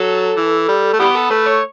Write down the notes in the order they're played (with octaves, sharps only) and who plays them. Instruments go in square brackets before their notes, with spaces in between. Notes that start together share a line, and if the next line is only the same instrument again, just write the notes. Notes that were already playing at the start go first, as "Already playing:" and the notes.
Already playing: [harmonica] F#3 [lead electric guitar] A4
[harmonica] E3
G3
A3
[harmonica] E3 G3 B3 [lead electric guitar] G4
[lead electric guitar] A4
[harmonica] A3 [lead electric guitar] B4
[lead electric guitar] C#5